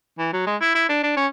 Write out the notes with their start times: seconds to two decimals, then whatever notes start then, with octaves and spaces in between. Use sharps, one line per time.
0.19 E3
0.33 F#3
0.46 G#3
0.61 E4
0.75 E4
0.89 D4
1.03 D4
1.17 C#4